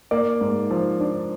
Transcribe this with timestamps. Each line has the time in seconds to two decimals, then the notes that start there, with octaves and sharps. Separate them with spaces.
0.11 A#3 D5
0.41 G#2
0.71 F3
1.01 D4